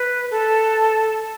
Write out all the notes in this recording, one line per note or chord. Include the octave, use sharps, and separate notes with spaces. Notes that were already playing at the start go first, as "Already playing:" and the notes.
Already playing: B4
A4